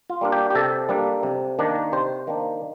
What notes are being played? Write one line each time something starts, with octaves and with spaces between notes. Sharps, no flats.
F4
G3 A#3 D4
G4
G4
C3 A4
G3 A#3 D4
C3
D#3 A#3 D4
C3 C5
D#3 A#3 D4